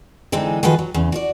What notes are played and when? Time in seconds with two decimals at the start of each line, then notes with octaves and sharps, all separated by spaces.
0.32 D3 E3 G#3 C4 D#4
0.63 D#3 F3 F#4 G#4 A4 B4
0.79 F#3
0.94 E2 C#3
1.12 F#4 C#5 D5